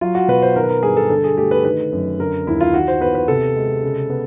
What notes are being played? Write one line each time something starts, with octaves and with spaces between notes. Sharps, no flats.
F#3 F4
F#4
B2 B4
C5
D#3 A#4
B4
A#4
G2 G#4
A4
D3 A4
G#4
A3 G4
B4
D#3 B4
F#2
D3 A#4
D#2 E4
F4
D#3 F#4
C5
B3 B4
B4
C3 A4
G#3
C#3
B3